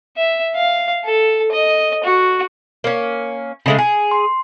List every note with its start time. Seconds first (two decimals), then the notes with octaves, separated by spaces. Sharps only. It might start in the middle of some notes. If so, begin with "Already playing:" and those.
0.17 E5
0.55 F5
1.04 A4
1.52 D#5
2.04 F#4
2.84 A#3 C#4
3.66 C#3 G#3 A3
3.78 G#4 G#5
4.11 C6